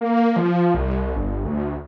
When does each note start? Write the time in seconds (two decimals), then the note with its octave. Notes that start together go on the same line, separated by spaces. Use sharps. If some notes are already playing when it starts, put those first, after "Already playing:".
0.01 A#3
0.36 F3
0.74 C2
1.16 G1
1.45 D2